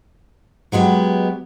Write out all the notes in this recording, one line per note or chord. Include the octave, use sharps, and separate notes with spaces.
F#3 G#3 B3 F4 G4